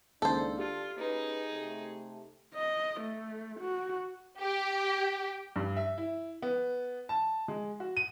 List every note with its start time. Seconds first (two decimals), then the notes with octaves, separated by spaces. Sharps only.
0.22 C#2 D#3 A#3 D4 A4 C5
0.59 F4 G4
0.98 C#4 D#4 G#4 B4
1.52 C3 A3
2.55 D#5
3.00 A3
3.60 F#4
4.40 G4
5.56 G2
5.77 E5
5.98 E4
6.42 B3
7.09 A5
7.48 G#3
7.80 F#4
7.97 D#7